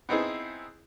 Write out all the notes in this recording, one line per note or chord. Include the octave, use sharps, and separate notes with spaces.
B3 C4 D#4 E4 G#4